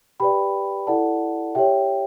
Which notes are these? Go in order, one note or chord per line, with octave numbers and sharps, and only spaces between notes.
G4 B4 D5 G5 B5
E4 A4 D5 F#5 A5
G4 C#5 E5 G5